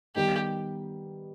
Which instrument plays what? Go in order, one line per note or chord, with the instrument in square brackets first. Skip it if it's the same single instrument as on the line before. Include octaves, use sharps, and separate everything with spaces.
[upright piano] D#3 G3 B3 D#4 [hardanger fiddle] G4